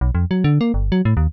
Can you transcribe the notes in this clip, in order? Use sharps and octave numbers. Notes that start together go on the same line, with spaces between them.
B1
F2
F#3
D3
A#3
G1
F#3
A2
D#2